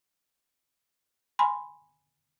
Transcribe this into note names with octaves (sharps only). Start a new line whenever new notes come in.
G#5 B5 C6